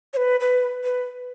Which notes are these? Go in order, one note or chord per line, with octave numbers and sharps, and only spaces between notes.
C#5
B4
B4
B4